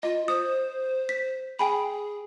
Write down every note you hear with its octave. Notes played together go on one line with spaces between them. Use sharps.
F4 D#5
C5 D#6
B6
G#4 G5 G#5 B5